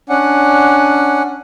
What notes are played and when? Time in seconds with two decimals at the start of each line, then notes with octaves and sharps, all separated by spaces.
0.09 C#4 D4 F#5